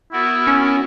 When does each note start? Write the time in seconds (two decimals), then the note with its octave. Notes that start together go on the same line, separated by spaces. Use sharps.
0.13 B3 E4 F#4 A#4
0.47 C#4